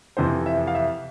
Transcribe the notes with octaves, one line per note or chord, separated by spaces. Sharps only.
F2 C3 E3 C5
E5
F5
E5